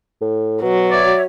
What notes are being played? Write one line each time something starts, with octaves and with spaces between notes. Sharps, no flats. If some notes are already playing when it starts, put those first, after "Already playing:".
A2
B2 F#3
C#5 D5 E5